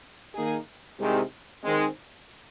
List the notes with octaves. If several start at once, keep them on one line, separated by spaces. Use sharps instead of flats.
D#3 A#3 D#4 G#4
C2 C3 D#3 G#3
D#3 G#3 C4